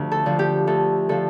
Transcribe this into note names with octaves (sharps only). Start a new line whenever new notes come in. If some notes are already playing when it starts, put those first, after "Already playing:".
Already playing: D2 D3 F3 G4
A4
D3 F3
G4
D2 A4
D3 F3 A4